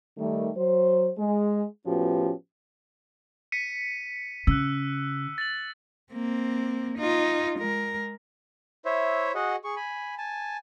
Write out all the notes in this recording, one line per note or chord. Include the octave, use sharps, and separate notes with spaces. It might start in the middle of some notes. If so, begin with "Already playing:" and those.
D#3 G3 A3
F#3 C5
G#3
A2 F3 B3 C#4 F#4 G4
B6 C#7 D#7
C#3 E6 F#6
A6 F#7
A#3 C4
D#4 F4
G#3 A#4
E4 C5 C#5 E5
F#4 G#4 D#5 F#5
G#4 C#6
G#5 B5
G#5 A5